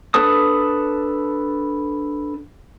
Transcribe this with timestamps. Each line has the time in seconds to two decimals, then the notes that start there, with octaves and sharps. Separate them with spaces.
0.14 D4 A4 B4 A5 D#6